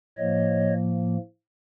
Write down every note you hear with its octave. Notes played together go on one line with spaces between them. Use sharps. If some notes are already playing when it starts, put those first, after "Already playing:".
A2 F3 A#3 C#5 D#5